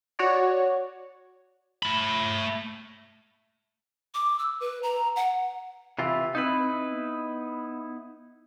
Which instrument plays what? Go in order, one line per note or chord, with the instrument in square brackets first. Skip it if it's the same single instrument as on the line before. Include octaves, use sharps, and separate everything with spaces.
[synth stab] F#4 C#5 D5
[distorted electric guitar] A3 B5
[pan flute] D6
E6
B4
A#5
F#5
[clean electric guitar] C3 E3 F4 [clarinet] E5
[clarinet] C4 [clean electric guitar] D#4 E4 B4
[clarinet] B3